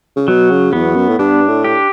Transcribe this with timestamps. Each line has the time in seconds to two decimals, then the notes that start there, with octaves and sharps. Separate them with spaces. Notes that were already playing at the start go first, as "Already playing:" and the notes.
0.16 C#3
0.28 B2 F#3
0.51 C#3
0.73 E2 B3
0.96 F#2
1.09 A2
1.19 G2 D4
1.48 A2
1.64 G4